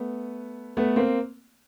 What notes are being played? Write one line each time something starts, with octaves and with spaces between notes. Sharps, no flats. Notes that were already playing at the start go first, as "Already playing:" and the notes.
Already playing: A3 B3
A3 B3
A#3 C4